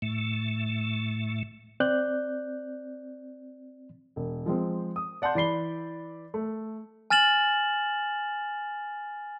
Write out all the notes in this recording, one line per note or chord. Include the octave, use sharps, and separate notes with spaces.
A2 A3
C4 D5 F#6 G6
E1
F3 G#3 C4
D#6
D5 F#5 A5 C6 G6
E3 D5 B5 C7 G7
A3
G#5 F6 A6 E7 F#7